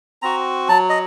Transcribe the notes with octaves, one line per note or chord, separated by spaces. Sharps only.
C4 F#4 A#5
F#3 A5
D#5